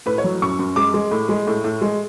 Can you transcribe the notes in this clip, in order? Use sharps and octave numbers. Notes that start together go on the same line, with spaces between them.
A2 B4
C#5
F#3
F#2 C#6
F#2
G#3 D6
G#3
A2
G#3
A2
A2
G#3